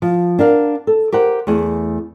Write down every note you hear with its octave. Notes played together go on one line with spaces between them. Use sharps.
F3
D4 A#4 F5 F#5
A4
G4 A#4 C5 F#5
E2 A3 G#4